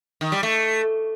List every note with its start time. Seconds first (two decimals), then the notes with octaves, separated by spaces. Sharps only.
0.21 D#3
0.32 G3
0.43 A3